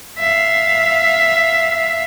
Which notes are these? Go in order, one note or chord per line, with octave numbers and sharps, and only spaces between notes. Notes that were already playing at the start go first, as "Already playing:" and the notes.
E5 F5